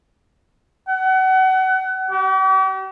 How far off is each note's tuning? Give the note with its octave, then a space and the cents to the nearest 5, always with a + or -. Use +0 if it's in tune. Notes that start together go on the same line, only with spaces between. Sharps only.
F#5 +30
G4 -45